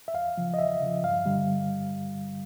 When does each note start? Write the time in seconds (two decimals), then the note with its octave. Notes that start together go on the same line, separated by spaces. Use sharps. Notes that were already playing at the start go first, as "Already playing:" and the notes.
0.08 E5
0.14 E2 F5
0.37 C#3 F3
0.54 D#5
0.59 E2 E5
0.81 C#3 F3
1.03 G2 F5
1.26 D3 G3